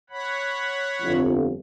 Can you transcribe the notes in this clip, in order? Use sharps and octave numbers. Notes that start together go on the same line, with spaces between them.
C#5 F#5 B5
G1 F2